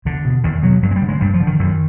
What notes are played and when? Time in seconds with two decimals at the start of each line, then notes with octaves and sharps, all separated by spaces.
0.05 E2 D3
0.25 B2
0.44 E2 D#3
0.63 B2 F#3
0.83 G2 F#3
0.91 G#3
0.96 G3
1.02 D3
1.09 G#3
1.21 G2 G3
1.34 F3
1.40 D3
1.47 D#3
1.59 F#2 D#3